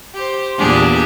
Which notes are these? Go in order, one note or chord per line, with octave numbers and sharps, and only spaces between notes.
G4 C5
E2 A#2 D4 G4 G#4